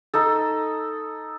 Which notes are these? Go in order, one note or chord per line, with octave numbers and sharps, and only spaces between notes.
D#4 A4